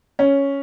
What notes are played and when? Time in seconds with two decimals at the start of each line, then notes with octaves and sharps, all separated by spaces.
0.19 C#4